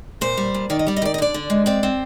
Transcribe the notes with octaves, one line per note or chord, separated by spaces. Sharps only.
A#2 C5
G3
A#2
D#3 D5
D#5
G3 D5
D#5
D#3 D5
D#5
D3 D5
D3
G#3
C4 D5
C4